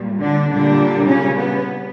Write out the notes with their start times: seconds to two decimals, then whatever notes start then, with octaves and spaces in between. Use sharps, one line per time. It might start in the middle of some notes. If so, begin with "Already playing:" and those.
Already playing: A#2 G3
0.19 D3 D4
0.48 A#2 D3 G3 D4
1.06 C#3 C#4
1.35 B3